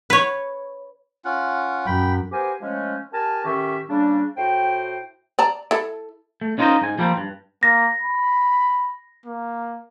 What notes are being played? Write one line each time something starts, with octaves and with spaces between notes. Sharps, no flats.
B4 C#5
C#4 F4 F#5
F#2 G5 B5
B3 G4 A#4 C5 G#5
F3 G#3 A3 C#4
G4 A#4 G#5 A5
A2 D#3 C#4 G4 E5 C#6
C#3 G3 A#3 D4
A2 F#4 C5 G5
D5 A5 A#5
E4 A4
A3
C#4 D#4 F4 A#4 C5 D#5
G#2 G#5
F3 G3 A#3 C4
G2
A#3 A#6
B5
A#3